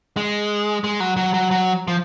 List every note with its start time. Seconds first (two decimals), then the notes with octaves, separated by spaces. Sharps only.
0.17 G#3
0.84 G#3
1.00 F#3
1.17 F#3
1.34 F#3
1.51 F#3
1.88 F3